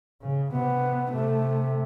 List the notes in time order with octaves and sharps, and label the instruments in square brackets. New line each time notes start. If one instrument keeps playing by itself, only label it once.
[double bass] C#3
[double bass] C3 [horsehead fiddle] B3
[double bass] C3 [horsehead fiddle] A3